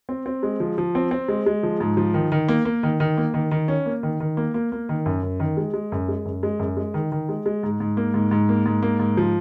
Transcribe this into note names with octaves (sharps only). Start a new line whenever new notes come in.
C4
C4
G#3
F3
F3
C4
C4
G#3
G#3
F3
G#2
F3
D#3
D#3
A#3
A#3
D#3
D#3
A#3
D#3
D#3
C#4
A#3
D#3
D#3
A#3
A#3
A#3
D#3
F#2
F#2
D#3
G#3
G#3
F#2
G#3
F#2
G#3
F#2
G#3
D#3
D#3
G#3
G#3
G#2
G#2
A#3
G#2
G#2
A#3
G#2
A#3
G#2
F3